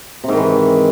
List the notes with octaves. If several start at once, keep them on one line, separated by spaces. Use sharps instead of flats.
G#2 C3 D#3 E3